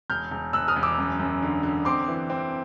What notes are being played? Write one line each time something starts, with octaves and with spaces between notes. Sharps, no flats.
E1 F6 G6
E1
E1 E6 F#6
D#6 F6
E1
D6 E6
F#2
F#2
D3
D3
C4 C6 D6
E3
C4